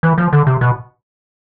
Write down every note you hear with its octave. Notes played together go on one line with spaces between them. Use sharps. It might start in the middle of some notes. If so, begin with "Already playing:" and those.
E3
F3
D3
C3
B2